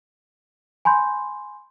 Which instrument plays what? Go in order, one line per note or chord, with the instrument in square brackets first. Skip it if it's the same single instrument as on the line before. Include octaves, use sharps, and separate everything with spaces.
[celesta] G#5 B5 C6 G6